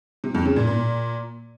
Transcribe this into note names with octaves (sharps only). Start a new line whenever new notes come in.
C3
F2
C#3
A#2
A#2